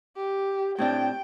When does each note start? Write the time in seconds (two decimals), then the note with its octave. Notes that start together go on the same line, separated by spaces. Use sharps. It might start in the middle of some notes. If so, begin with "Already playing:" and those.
0.17 G4
0.79 A2 C4 D4 G5